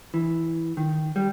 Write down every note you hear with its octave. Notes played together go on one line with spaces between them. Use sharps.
E3
D#3
G3